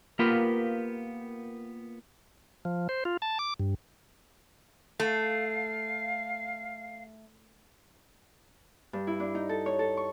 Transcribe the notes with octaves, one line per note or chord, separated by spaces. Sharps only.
A#3 B3 F4 G4 A#4 B4
F3
C5
F4
A5
D6
G2
A3 F5
G2
E4
D4
D#4
A4
C#5
A4
C#6